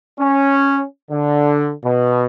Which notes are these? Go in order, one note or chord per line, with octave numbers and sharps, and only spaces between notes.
C#4
D3
B2